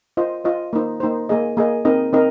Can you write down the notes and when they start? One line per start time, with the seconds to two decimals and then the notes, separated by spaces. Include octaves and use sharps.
0.17 F4 C5 D#5
0.44 F4 C5 D#5
0.73 A#3 D#4 C5
1.00 A#3 D#4 C5
1.29 A#3 G#4 D#5
1.57 A#3 G#4 D#5
1.85 C4 D#4 A#4 D#5
2.13 C4 D#4 A#4 D#5